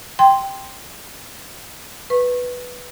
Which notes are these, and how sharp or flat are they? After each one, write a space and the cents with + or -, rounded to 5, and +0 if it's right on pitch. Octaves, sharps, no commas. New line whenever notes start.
G5 +0 C6 +0
B4 +0 C#6 -25